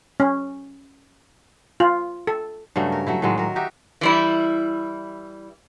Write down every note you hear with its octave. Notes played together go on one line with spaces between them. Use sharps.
C#4
F4
A4
G2 C#3 F#3 A3
A#4
F#3 A3 E4
A2 D#3 F#3 G#3
F#3 A#4
D#4 F#4 G4 E5
E3 G3 E4